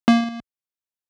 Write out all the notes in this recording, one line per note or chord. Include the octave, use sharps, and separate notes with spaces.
A#3